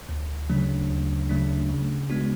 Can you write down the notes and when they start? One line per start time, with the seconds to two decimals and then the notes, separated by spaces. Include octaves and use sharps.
0.09 D2
0.50 C#3 F#3 A3 D4
0.90 D2
1.29 C#3 F#3 A3 D4
1.70 C#3
2.10 G#3 B3 D4 F#4